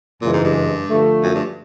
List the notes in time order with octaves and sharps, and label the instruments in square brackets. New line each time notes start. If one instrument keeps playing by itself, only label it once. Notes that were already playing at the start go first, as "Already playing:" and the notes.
[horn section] F#2 C#3 E3 G#3 [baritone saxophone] A#2
[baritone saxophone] G#2
G2
[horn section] D3 F3 A3
[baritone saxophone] F#2
G2